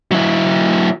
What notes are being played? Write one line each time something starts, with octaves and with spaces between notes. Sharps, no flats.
F#3 E4